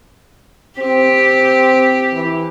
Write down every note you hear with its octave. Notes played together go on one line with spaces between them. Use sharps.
C4 G4
E3